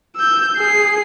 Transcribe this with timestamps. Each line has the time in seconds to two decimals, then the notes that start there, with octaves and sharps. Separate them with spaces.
0.16 E6 G6
0.57 G#4 C7